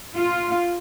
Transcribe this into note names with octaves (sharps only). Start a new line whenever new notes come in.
F4